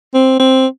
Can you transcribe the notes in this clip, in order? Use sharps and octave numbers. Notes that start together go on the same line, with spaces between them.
C4
C4